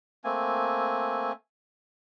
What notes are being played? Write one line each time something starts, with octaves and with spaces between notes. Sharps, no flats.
A3 A#3 C4 G#5